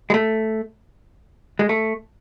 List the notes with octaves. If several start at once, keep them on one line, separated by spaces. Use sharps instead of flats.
G#3
A3
G#3
A3